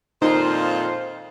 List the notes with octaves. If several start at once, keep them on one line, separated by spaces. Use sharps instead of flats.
F2 A#2 D#3 D#4 F4 C5